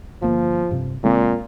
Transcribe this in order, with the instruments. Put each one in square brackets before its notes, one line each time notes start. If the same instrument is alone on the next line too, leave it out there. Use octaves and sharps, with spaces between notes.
[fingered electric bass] G1 A#3 [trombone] F3
[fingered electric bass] G2 C3
[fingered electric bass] C#2 G#3 C4 [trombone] A#2